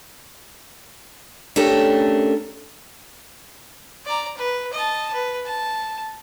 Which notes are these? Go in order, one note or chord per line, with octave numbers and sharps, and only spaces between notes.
A3 C#4 D4 G4 A4 A#4
D5 A#5
B4
D#5 A5
B4
A5